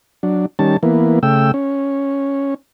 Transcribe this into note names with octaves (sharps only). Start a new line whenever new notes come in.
F#3 D4
D#3 G3 C#4 A5
E3 A#3 B3
C#3 A3 G5 E6
C#4